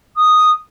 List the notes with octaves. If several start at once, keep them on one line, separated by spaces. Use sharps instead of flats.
D#6